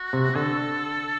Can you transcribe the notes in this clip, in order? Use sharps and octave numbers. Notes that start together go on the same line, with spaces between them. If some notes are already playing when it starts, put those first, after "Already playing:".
Already playing: F#4
C3
D3 A4